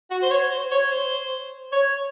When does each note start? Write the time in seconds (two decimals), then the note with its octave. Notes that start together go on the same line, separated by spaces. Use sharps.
0.10 F#4
0.22 C5
0.30 C#5
0.51 C5
0.71 C#5
0.91 C5
1.73 C#5